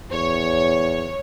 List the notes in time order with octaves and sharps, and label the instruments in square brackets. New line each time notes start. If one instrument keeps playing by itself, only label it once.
[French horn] E2 [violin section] C#5